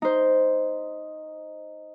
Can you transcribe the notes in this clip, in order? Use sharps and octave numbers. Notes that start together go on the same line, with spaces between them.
D#4 C5